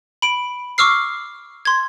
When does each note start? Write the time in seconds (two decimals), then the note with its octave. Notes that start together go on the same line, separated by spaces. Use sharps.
0.22 B5 D7
0.78 C#6 D6 E6 F6 C7
1.65 C6 G#6